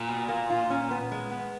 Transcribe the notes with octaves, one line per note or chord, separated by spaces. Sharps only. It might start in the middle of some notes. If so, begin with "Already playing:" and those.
Already playing: A#2
B2
A#3
F4
C#4
B3
G#3
B3